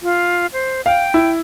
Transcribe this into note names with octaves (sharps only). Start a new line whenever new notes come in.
F4
C5
F5 G5
E4